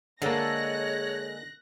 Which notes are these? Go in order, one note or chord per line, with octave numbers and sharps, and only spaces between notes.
D3 G#3 A#3 A4 C#5 F#6 A#6